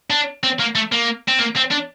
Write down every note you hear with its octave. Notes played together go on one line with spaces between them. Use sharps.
D4
C4
A#3
A3
A#3
C4
A#3
C4
D4